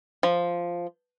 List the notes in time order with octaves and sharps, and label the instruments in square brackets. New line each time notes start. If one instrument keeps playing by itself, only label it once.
[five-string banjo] F3